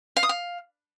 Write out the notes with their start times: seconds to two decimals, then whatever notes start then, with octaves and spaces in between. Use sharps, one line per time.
0.17 F5
0.23 D#6
0.29 F5